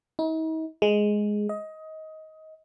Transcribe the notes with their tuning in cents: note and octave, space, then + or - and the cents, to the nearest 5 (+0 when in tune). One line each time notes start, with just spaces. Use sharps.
D#4 +45
G#3 +5
D#5 +20